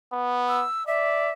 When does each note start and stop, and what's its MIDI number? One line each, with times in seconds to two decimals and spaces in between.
0.13 0.64 59
0.49 0.86 88
0.87 1.33 74
0.87 1.32 76